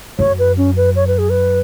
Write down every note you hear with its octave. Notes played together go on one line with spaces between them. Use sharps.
F#2 C#5
B4
C#4
B4
C#5
B4
G#4
B4